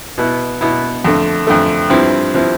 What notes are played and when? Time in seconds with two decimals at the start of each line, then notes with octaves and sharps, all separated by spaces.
0.18 B2 B3 E4
0.61 B2 B3 E4
1.04 F2 D3 A3
1.47 F2 D3 A3
1.90 G2 F3 C4 E4
2.34 F3 C4 E4